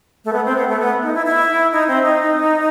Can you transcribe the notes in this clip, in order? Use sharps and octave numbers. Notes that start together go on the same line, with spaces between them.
A3
B3
C4
B3
A3
B3
D#4
E4
E4
D#4
C4
D#4